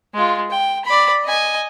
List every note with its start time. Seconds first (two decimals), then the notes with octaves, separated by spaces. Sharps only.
0.14 G#3 F4
0.51 G5
0.85 D5 B5
1.25 D#5 G#5